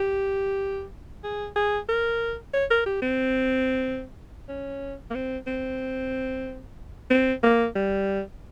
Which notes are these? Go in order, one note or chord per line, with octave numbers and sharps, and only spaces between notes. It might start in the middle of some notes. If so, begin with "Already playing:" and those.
Already playing: G4
G#4
G#4
A#4
C#5
A#4
G4
C4
C#4
A#3
C4
C4
C4
A#3
G3